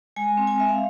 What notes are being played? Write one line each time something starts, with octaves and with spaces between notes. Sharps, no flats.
G#3 G#5
C4
G#5
G#3 E5
F5